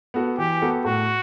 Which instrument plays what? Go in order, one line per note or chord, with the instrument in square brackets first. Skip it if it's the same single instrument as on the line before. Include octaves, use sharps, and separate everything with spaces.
[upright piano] B3 F#4 A4
[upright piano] E3 [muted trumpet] G4
[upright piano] B3 F#4 A4
[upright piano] A2 [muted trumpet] F#4